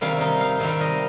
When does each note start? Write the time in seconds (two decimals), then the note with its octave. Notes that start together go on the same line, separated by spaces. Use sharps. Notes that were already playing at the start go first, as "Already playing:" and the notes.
0.01 C3 D#3 G3 F5
0.21 D#4
0.41 F5
0.60 C3 D#3 G3 F5
0.81 D#5